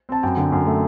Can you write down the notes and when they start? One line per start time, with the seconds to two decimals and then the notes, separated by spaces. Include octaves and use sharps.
0.09 C4 A5
0.23 F#2 G5
0.37 D3
0.52 F#2
0.66 A3